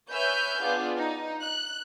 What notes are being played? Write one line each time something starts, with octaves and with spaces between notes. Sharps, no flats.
B4 C#5 E5 G#5 F6 G6
B3 D4 F4 G#4
D#4
F#6